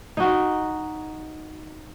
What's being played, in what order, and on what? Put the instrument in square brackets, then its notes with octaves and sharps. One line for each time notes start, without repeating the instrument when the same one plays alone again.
[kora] D#4 F#4